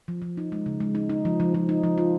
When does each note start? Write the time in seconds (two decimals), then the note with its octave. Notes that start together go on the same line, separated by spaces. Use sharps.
0.08 F3
0.22 F3
0.37 D#4
0.52 G#3
0.66 C#3
0.80 G#3
0.95 D#4
1.09 D#4
1.25 F3
1.40 F3
1.54 F3
1.69 D#4
1.83 F3
1.98 F4